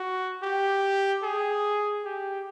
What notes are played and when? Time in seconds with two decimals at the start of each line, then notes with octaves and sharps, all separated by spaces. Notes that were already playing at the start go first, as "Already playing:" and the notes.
Already playing: F#4
0.42 G4
1.23 G#4
2.04 G4